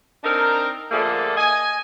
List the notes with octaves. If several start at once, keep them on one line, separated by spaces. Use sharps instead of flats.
C4 D4 D#4 A#4
D3 F3 A3 A#3 G#4 A4
D#5 G#5